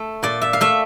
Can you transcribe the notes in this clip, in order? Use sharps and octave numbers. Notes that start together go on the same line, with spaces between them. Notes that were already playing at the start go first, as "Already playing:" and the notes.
Already playing: A3
A#2 D5
E5
F5
A3 E5